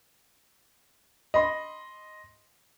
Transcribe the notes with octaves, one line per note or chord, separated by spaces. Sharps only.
D#5 B5 C6